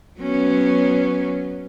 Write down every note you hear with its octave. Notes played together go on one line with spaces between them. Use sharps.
F#3 B3 C#4